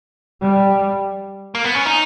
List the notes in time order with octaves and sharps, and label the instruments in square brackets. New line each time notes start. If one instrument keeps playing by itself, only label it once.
[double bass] G3
[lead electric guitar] A#3
B3
C#4
D#4